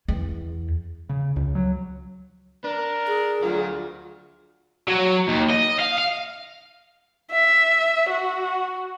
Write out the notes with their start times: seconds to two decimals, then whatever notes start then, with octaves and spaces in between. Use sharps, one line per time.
0.08 E2
1.09 C#3
1.36 C#2
1.55 F#3
2.64 D4 A#4
3.07 G#4
3.43 D2 F#3 F4 F#4
4.88 F#3
5.29 D#2
5.50 D#5
5.79 F5
5.98 F5
7.31 E5
8.09 F#4